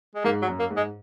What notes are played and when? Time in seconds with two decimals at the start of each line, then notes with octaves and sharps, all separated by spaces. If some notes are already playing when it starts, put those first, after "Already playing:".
0.16 G#3
0.24 G#2 A#3
0.42 F#3
0.48 F#2
0.59 A#3
0.70 G#2
0.77 G#3